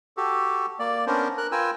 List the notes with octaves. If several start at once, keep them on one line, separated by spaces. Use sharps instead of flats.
F#4 G4 A4
A#3 D5
B3 C#4 D4 A#4 C5
A#4 F#6
F4 A#4 B4 G5 G#5 E6